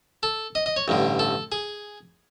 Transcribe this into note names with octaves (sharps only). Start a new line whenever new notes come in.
A4
D#5
D#5
C#5
A1 G2 D3
A4
G#4